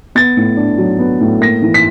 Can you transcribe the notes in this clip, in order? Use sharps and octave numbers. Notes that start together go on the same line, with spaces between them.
B3 A6
A2
D4
F#3
B3
A2
A#3 A#6
E3
B6